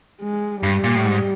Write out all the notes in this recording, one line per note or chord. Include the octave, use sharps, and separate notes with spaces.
G#3
G2 G3
A#2
A2
G#2